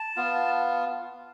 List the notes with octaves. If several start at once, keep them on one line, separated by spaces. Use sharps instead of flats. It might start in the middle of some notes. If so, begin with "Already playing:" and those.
Already playing: A5
B3 F4